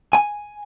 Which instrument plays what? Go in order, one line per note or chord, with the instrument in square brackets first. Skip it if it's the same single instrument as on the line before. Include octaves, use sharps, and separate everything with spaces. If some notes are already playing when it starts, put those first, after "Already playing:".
[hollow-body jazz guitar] G#5